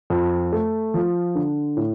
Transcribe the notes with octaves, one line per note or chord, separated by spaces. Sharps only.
F2
A3
F3
D3
A2